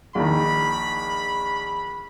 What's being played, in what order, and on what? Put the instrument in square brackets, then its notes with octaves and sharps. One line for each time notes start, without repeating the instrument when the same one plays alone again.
[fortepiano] A#1 D#3 [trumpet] B5